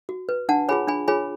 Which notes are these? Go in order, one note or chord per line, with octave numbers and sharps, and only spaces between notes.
F#4
B4
D4 F#5 A5
F4 G#4 C#5 G#5 B5
D4 G#5 B5
F4 G#4 C#5 G#5 B5